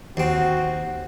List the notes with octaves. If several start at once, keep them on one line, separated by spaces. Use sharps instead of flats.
D#2 C4 F#4